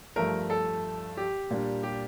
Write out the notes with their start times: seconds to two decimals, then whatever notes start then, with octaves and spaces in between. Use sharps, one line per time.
0.16 G2 F3 A3 A#4
0.50 A4
1.17 G4
1.51 A#2 G3 D4
1.83 G4